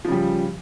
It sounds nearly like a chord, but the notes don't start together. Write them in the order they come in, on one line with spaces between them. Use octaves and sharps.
F3 C#3 G3